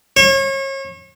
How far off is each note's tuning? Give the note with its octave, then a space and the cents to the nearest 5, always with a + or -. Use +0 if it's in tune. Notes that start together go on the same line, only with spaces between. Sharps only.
C#5 -35